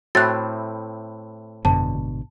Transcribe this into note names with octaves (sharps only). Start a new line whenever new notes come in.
A2 C4 E4 F#4 F#6 A6
G#1 F#2 B2 D3 A5